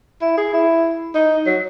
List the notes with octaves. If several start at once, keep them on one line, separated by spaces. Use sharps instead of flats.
E4
G#4
E4
D#4
F#3